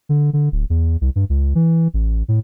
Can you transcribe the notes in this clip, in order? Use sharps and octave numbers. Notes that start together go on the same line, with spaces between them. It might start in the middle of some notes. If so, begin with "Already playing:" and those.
D3
D3
D1
E2
C2
G2
C#2
E3
A1
A2